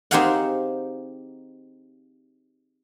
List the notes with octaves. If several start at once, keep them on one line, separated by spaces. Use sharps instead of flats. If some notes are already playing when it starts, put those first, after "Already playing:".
C4 D#4 G4 G#4 F5 F#5